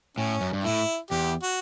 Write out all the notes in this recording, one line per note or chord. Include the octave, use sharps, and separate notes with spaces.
A2 C#4
F#2
G2
A2 E4
E2 G4
F#4